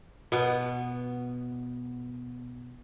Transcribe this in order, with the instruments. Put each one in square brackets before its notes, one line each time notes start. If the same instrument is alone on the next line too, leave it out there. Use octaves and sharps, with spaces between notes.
[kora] B2 B3